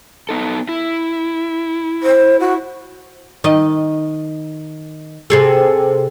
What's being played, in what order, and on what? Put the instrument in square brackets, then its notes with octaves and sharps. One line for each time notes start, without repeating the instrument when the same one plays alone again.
[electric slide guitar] B3 D#4 A4
E4
[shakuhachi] C5
F#4
[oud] D#3 D#5
C3 G#4 A4